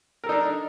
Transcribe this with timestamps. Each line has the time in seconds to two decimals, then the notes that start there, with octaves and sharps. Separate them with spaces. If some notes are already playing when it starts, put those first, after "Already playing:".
0.24 A#4
0.26 A4
0.29 D#4
0.32 D4